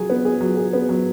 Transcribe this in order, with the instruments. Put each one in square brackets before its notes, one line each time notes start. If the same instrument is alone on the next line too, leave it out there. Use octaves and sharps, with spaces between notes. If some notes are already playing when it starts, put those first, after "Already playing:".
Already playing: [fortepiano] F#3 G#4
B3
G#4
F#3
G#4
B3
F#3